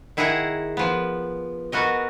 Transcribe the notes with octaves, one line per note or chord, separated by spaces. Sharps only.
D#3 E4 G#4 F#5 A#5
F3 B3
B3 F#4 A#4 D#5